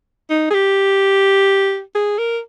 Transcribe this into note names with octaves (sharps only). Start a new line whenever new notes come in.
D#4
G#4
G4
G#4
A#4